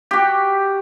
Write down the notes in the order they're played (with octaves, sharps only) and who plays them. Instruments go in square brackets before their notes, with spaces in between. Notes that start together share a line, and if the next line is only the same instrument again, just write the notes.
[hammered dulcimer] F#4 G4